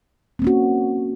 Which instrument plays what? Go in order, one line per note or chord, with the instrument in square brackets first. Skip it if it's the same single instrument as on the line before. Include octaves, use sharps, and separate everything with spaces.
[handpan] C4
A#3
C#4
F#4